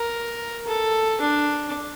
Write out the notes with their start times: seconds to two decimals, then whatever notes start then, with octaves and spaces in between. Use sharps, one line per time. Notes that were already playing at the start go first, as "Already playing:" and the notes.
Already playing: A#4
0.67 A4
1.21 D4